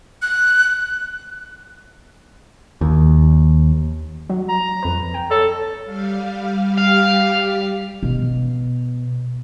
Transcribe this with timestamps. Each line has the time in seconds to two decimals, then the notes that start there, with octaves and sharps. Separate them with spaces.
0.22 F#6
2.81 D#2
4.30 F#3
4.49 A#5
4.83 F2 B4
5.14 G5
5.31 A4 C#5 A5
5.84 G3 F5
6.77 G3 G4 F5
8.03 B2